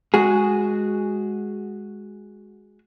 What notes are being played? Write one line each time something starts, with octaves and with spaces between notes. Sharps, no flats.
G#3 F#4 G#4